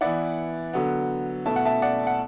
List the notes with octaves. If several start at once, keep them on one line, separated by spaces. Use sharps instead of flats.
E3 B3 E4 D5 F#5
D3 F#3 B3
B2 A3 E4 A5
F#5
E5 A5
D5 F#5
F#5